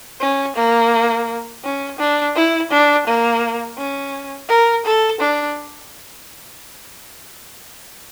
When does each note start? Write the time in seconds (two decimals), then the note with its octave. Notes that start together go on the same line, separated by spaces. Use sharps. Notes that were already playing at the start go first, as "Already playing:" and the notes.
0.21 C#4
0.56 A#3
1.64 C#4
1.99 D4
2.36 E4
2.71 D4
3.07 A#3
3.78 C#4
4.49 A#4
4.85 A4
5.21 D4